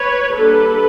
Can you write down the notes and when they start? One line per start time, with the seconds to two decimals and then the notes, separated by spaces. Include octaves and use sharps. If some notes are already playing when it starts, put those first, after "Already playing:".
Already playing: B4 C#5
0.34 G3 A#3 D4 A4 B4